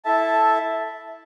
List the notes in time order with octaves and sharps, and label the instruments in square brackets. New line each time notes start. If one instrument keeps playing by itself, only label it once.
[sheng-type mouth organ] E4 A4 E5 A5